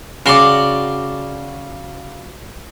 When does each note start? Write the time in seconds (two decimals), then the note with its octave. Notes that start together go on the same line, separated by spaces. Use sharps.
0.26 C#3 F#4 D5 C6